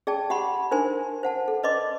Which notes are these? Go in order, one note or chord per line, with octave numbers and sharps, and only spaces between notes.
G#4 D5 G5 A5
G4 F#5 B5 C6
D4 D#4 A#4 C5 G#5 C6
C5 F#5 A5
A4
B4 D5 D#5 C6 D6